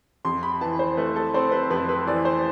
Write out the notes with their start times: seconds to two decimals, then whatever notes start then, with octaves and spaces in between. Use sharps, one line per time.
0.25 F2 C6
0.43 B5
0.61 E3 A5
0.79 C5
0.97 A3 B4
1.16 A4
1.34 C4 C5
1.52 B4
1.70 F2 B4
1.89 B4
2.07 E3 D5
2.25 C5